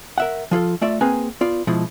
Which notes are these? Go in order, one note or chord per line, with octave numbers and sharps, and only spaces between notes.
A#4 E5 F#5
F3 F4 G#4 A4
A3 F4 D5 E5
A#3 C4 G#4 B4 G#5 A#5
B3 F4 D5
B2 F3 G#3 E4